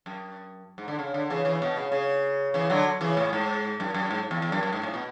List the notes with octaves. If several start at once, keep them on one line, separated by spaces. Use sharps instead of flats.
F#2
G#2
D3
C#3
D3
C#3 E3
C#3 E3
B2
C#3
C#3
C#3 E3
D3 F#3
C#3 E3
A2
G#2
F#2
F#2
G#2
E2
E2
F#2
F#2
G#2
A2
B2